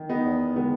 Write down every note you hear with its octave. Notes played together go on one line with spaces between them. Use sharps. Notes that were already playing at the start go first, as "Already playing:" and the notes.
Already playing: D#3
B3 D#4
E2
D#3 G#3 B3